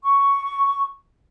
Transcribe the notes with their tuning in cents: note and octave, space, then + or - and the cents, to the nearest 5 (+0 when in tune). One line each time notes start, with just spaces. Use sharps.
C#6 +5